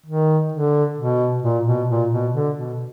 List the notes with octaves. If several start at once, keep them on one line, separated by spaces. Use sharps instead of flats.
D#3
D3
B2
A#2
B2
A#2
B2
D3
B2